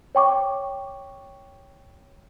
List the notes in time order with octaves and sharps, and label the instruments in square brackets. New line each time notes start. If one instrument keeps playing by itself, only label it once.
[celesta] C#5 G5 C#6 D6